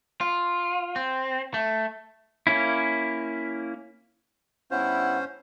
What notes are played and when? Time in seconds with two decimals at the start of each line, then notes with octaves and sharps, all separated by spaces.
0.21 F4
0.96 C4
1.54 A3
2.47 A#3 C#4 E4
4.71 G2 B3 C#4 E4 C5 F#5